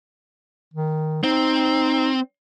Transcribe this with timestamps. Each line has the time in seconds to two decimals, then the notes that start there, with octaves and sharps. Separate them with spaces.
0.74 D#3
1.24 C4 D#4